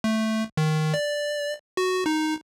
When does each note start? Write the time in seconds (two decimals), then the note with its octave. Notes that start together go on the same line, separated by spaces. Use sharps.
0.04 A3
0.57 D#3
0.94 D5
1.77 F#4
2.06 D#4